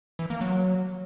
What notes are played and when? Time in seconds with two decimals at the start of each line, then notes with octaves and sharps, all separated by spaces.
0.19 E3
0.30 A#3
0.41 F#3